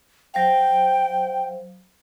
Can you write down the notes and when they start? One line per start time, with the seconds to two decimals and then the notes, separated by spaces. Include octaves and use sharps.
0.34 F#3 C5 F5 G5